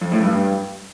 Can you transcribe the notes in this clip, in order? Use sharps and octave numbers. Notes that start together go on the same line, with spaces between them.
F2
A2
G2
G2